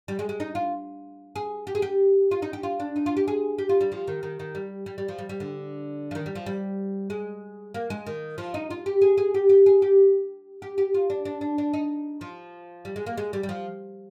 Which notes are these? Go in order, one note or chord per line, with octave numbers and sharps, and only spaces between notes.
G3
G#3
G#3
D#4
F4
G#4
G4
G#4
G4
F4
D#4
G4
F4
D4
D#4
F4
G4
G#4
G4
F4
G3
F3
D#3
D#3
D#3
G3
G3
G3
F3
G3
G3
D3
F3
D#3
G3
F3
G3
G#3
A#3
G#3
D#3
F3
D#4
F4
G4
G#4
G#4
G4
G4
G#4
G4
G4
G4
F4
D4
D4
D4
D4
D#4
F3
G3
G#3
A#3
G#3
G3
G3
F3